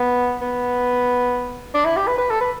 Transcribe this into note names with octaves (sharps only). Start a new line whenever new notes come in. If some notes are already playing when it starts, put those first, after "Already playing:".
Already playing: B3
B3
D4
E4
G4
B4
B4
A4
B4